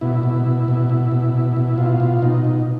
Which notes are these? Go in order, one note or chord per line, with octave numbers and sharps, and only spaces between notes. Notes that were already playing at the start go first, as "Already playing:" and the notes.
B2 E4
B2
B2
B2
B2
B2
B2
B2
B2 F4
B2
B2 D#4
B2